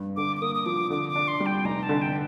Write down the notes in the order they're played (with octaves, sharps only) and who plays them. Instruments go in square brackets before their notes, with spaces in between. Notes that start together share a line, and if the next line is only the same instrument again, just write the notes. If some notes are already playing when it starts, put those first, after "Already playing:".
Already playing: [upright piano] G2
[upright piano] D3 [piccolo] D6
[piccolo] D6
[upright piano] A#3 [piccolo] D#6
[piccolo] D#6
[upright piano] F3 [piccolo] D6
[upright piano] D3 [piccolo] D6
[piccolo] D6
[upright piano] D4
[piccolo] C6
[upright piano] G3
[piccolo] G5
[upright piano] F1 [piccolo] A#5
[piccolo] A5
[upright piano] D3
[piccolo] G5